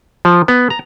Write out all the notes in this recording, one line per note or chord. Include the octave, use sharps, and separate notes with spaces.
F3
B3
A#5